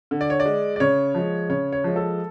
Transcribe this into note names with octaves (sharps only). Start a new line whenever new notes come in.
D3
D5
C#5
D5
G#3
D5
C#3 C#5
F3 G#3
C#3 C#5
C#5
F3 G#3
A4